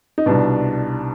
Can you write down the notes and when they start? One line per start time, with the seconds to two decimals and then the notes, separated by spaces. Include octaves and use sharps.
0.18 D#4
0.26 C2 B2 D4